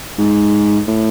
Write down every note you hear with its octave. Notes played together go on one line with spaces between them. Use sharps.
G#2
A2